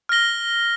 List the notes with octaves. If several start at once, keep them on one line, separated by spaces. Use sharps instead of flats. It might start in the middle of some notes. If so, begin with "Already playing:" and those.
F6 A#6 G7